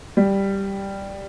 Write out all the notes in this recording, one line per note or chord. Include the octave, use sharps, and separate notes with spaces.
G3